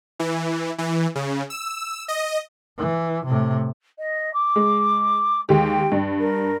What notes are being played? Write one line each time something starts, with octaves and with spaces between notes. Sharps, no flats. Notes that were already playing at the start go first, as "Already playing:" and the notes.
E3
E3
C#3
E6
D#5
E3
A2 C3
D#5
D6
G#3
D#2 G#3 G4 G5
G2
A#4